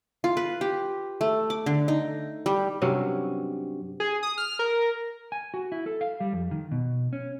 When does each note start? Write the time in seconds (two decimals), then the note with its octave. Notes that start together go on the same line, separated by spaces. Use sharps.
0.24 F4
0.37 B4
0.61 G4
1.21 A3
1.50 D6
1.66 D3
1.88 D#4
2.46 G3
2.82 G2 C3 F#3 C#4
4.00 G#4
4.23 D#6
4.38 F6
4.59 A#4
5.32 G#5
5.54 F#4
5.72 E4
5.86 A4
6.01 F5
6.20 G3
6.33 F2
6.51 D#3
6.72 B2
7.13 C#4